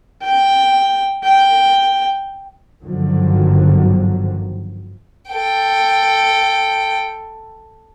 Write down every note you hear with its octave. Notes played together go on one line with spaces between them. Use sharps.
G5
G5
G1 G#2 D3 D#3 F3 F#3
A4 G5